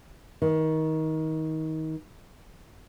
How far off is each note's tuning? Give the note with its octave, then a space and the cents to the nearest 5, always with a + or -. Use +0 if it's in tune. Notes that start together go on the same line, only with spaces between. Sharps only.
D#3 +25